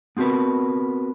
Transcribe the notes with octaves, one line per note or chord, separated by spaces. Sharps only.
B3 C4 F#4 A#4 B4